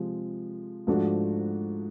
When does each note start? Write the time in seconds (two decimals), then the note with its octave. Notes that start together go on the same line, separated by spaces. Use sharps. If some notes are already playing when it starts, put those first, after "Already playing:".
Already playing: C3 F3 G#3
0.87 G#2 F3 A3 D4 F#4